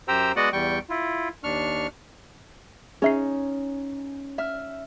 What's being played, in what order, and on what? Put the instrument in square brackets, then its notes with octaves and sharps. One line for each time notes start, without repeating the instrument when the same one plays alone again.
[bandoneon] F#2 G4 C5 G5 A#5 E6
G#3 B3 F#4 D5 D#5 F#5
E2 G3 G5 C#6
E4 F4
D#2 D4 C#6 F6
[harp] C#4 D#4 [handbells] G#4 E5 C7
[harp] E5 F6